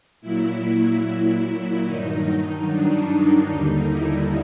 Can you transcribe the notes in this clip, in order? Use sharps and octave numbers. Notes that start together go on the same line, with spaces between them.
A#2 F#3 E4
G2 D#3 F#3 D#4
D4
D#4
D#2 D3 G3 D#4
E4